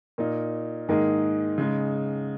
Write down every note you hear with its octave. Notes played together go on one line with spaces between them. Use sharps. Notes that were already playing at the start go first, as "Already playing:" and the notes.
A#2 A#3 D#4
G#2 D#3 A#3 D#4 G#4
C#3 G#3 D#4